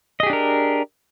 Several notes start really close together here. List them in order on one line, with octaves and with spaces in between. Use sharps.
D#5 G#4 G4 D4 A#4